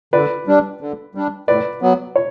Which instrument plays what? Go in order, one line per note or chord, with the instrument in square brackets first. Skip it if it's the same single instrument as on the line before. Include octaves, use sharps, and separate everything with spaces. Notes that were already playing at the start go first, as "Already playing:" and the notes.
[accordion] D3 [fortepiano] B4 D5
[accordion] G3 D4
D3
G3 D4
[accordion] A2 [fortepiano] B4 D5
[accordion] F#3 B3
[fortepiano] C#5